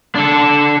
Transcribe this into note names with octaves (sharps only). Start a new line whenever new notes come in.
D4 A4